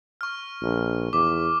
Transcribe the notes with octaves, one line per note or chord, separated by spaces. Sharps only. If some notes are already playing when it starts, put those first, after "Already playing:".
C#6 F6
A#1
E2 D6